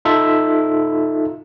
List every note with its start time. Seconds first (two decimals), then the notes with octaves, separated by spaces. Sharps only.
0.05 D#4 F4 A4 E5